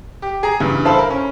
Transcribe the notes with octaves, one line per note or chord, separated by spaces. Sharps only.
G4
G#4 A#5
G2 C#3 E3
E4 A4 C5 F5 A5 B5
A#4
C#4